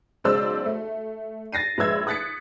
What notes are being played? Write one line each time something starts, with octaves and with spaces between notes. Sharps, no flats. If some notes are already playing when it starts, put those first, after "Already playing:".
B1 C#3 G#3 C5 D5 E6
A3
A6 A#6 C7 D#7
A#1 G#3 B4 E5 E6 G#6
D#6 F#6 A6 B6 C#7